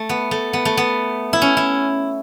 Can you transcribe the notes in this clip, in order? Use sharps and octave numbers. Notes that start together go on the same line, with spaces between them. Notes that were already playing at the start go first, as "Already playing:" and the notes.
Already playing: A3
B3
A3
B3
A3
B3
E4
C#4
E4